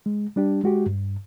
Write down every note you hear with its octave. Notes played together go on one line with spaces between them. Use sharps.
G#3
G3 D4 G4
G#3 F#4 G4
G2